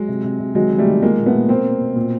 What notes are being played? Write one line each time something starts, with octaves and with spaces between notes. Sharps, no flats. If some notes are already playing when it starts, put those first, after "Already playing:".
Already playing: F#3 G#3
C3
C3
C3
D#3 F#3 G#3
D#3
G3 A3
D#3
F3 G#3 A#3
A#2
A3 B3
A#2
B2 A#3 C4
B2
B2
A#2